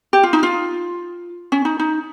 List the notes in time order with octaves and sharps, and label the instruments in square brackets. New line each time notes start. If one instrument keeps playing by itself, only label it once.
[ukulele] G4
F4
D#4
F4
C#4
D#4
D#4